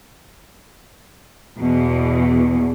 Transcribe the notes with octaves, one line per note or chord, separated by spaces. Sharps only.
E2 B2